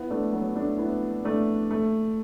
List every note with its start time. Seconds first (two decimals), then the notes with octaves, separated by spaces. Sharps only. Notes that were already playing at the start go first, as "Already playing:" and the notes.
Already playing: B3 E4
0.10 A3 D4
0.33 F#3 B3
0.55 A3 D4
0.78 B3 E4
1.24 A3 D4
1.71 A3